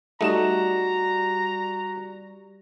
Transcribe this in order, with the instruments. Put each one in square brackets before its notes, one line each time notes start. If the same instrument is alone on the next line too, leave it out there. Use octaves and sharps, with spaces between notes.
[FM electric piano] G3 G4 D5 [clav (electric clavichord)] A3 D#4 [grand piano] F#4 E7 [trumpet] A#5